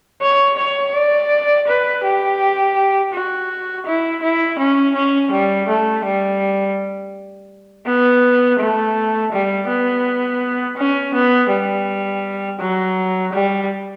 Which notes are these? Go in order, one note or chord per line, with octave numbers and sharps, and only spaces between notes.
C#5
C#5
D5
B4
G4
F#4
E4
E4
C#4
C#4
G3
A3
G3
B3
A3
G3
B3
C#4
B3
G3
F#3
G3